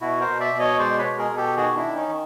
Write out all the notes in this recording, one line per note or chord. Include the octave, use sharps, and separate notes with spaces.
B2 E4 F#4
A#4 C5
B2
D5 E5
B2
C#5 D#5
G#3 C5 D5
B4 C#5
B2
G#4 A#4
B2
G4 A4
D#3 F#4 G#4
D4 E4
D#3
C#4 D#4
D#3